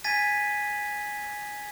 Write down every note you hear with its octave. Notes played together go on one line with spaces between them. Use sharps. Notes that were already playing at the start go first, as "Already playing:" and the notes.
G#5 G#6 A6 B6 D#7